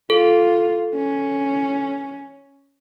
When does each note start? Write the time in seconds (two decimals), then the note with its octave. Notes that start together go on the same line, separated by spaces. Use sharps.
0.10 F4 A4
0.95 C#4